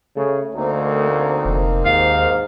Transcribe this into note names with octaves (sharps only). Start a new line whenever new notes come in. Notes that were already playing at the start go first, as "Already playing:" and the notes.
C#3 A3
D2 A#3 C4 D#4
F1
D#2 G#2 F5